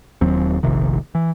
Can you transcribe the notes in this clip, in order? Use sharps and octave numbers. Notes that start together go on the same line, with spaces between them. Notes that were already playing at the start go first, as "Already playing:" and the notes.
D#1 D#2 F#3 C4
F1 A#1 C3 D#3
E3